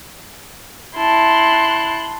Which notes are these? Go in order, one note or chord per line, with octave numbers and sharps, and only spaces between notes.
E4 A5 C6 F#6